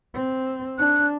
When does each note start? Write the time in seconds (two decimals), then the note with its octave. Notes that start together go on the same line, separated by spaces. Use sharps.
0.14 C4
0.79 D4 F#6